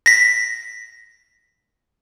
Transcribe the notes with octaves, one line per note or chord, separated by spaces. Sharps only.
A#6 B6